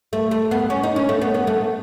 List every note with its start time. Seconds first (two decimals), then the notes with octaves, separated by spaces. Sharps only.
0.13 A3
0.31 A3
0.51 B3
0.70 C#4
0.83 D#4
0.96 C#4
1.09 A3
1.21 B3
1.34 B3
1.47 A3